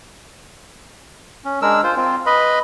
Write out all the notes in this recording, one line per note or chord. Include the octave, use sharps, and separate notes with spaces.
C#4
G#3 D4 A#4 E6
F4 C5
C4 F4
B4 D#5 B5